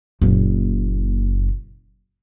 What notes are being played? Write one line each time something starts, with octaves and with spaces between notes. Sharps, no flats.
F#1 A#2